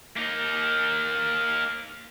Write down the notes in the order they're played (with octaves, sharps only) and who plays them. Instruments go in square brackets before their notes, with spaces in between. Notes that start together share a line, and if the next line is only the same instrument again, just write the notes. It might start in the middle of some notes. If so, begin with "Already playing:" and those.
[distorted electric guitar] A#3 D#4